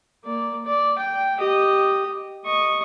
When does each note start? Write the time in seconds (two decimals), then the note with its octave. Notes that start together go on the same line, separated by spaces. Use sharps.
0.25 A#3 D5
0.66 D5
0.99 G5
1.37 G4 D#5
2.45 D#5 C#6